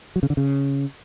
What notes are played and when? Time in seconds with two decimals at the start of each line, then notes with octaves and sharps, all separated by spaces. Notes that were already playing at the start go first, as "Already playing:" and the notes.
0.16 F#3
0.23 C#3
0.30 D3
0.37 C#3